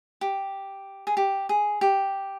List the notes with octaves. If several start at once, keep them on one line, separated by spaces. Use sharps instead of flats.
G4
G#4
G4
G#4
G4